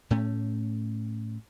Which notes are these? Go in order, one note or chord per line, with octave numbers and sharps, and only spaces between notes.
A2 A3 C#4